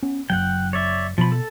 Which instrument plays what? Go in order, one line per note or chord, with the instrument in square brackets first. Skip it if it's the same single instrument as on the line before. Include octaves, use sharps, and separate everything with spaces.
[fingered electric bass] B3 C#4
[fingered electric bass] F#1 B1 F#3 [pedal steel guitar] F#5 G5
[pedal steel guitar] C#5 D5 E5
[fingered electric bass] B2 [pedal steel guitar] F3 B5
[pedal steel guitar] A4